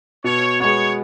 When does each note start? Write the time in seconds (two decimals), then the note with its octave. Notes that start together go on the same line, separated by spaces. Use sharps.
0.24 B2 C#5
0.60 G#3 B3 C#5